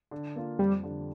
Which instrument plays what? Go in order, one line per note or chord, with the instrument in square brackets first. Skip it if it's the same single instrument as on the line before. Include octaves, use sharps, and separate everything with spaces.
[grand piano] D3
A#3 F4
[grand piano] F2 [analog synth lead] G3
[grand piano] D3 G3